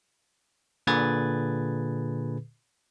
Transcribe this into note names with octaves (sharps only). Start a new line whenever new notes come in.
A#2 D3 G#4 B4 G#6 A6